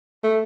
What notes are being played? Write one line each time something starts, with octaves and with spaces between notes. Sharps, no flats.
A3